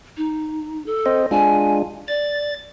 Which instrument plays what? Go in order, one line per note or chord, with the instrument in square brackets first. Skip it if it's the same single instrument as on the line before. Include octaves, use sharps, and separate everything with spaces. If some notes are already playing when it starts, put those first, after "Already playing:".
[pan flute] D#4
A4
[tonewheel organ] C4 C5 D#5
[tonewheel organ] G#3 D4 F4 [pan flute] G#5
[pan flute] D5 [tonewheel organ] A6